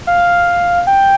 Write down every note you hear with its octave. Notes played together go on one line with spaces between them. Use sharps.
F5
G5